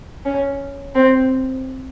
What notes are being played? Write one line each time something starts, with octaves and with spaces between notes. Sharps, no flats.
C#4
C4